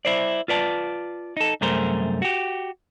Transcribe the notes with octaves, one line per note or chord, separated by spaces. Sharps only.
E4 C5 D5
F4 B4 D5 A5
D#4 A4
C2 F#2 A3 G#4 A#4 C5
F#4 G4